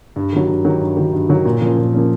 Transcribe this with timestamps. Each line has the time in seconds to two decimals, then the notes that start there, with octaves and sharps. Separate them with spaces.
0.16 G2
0.33 D#3 F#3
0.48 G2
0.65 D#3 F#3
0.81 G2
0.97 D#3 F#3
1.13 G2
1.29 D#3 F#3
1.45 A#2
1.61 F3 A#3 C#4
1.77 A#2
1.93 F3 A#3 C#4